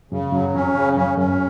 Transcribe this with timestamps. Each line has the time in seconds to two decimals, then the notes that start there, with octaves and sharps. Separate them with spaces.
0.11 F#2 C#3
0.32 F#2 F#3
0.55 F2 C#4
0.75 C#3
0.97 F#2 C#4
1.18 F#2 C#4